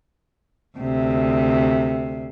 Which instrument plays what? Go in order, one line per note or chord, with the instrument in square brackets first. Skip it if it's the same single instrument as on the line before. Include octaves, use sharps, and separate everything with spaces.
[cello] D2 C3